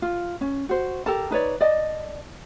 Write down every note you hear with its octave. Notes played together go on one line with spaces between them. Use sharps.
F4
C#4
F#4 C5
G4 A4 A#4 A5
D#4 B4 C#5 D5
D5 D#5 A5